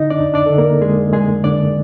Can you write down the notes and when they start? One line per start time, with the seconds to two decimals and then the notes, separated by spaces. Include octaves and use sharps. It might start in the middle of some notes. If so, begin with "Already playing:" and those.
Already playing: D3 D#4 D#5
0.10 D4 D5
0.19 F2
0.34 D4 D5
0.46 D3 A4
0.58 A#3 A#4
0.82 F2 G#3 G#4
1.13 F2 G#3 G#4
1.44 D3 D4 D5